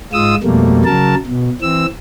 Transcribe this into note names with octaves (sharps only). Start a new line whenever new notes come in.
G#2 G#3 F4 D#6 E6
F2 B2 G3 A3 A#3
C#3 F#3 A#4 A5
B2
E3 C4 E6